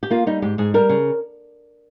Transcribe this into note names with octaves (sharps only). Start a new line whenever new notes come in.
G4
A#3 F4
G3 D#4
G#2 G4
G#2 G#4
G3 A#4
C#3